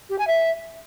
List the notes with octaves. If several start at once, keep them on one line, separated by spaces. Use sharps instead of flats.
G4
G#5
E5